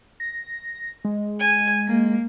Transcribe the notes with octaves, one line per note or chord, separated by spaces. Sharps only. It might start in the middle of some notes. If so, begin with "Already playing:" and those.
A#6
G#3
G#5
A#3